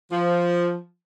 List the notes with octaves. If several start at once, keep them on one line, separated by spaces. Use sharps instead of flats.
F3